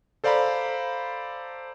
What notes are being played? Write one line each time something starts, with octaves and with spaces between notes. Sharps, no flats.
A4 C5 D5 F5 A#5 B5